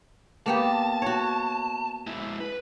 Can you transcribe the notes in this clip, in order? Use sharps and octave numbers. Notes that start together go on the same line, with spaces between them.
A#3 B3 G4 A5
F#4 C#5
G#3 E4
B4